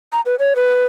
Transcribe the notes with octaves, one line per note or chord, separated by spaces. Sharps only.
A#5
B4
C#5
B4